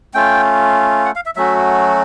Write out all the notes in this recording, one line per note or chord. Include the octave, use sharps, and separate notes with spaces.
A3 C#4 F4 G5
F#5
F5
E5
F#3 A3 C#4 F#4 E5